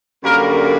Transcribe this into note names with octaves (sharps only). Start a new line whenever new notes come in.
F#2 D3 G3 A#3 A#4